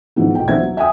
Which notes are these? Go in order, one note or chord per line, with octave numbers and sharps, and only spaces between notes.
G#2 F3 B3 E4
B1 G5
F3 B3 C5 E5 G#6
F#3
E5 G5 G#5 D#6